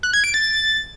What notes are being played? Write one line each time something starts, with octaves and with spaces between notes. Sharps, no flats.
F#6
G#6
D7
A6